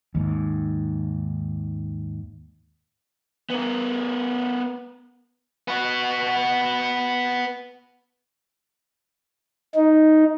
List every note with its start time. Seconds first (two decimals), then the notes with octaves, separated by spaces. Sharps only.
0.15 D#2 G#2
3.50 B3 A#4
5.68 B3 F#4
9.75 D#4